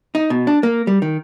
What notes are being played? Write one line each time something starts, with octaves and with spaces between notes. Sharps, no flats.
D#4
B2
D4
A#3
G3
D#3